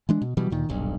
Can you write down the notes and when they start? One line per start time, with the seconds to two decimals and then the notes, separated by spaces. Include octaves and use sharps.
0.09 E3 G#3 D4
0.22 B2
0.37 B2 E3 F#3 G3
0.50 D2 A#2 D#3
0.69 D#1 B1 G2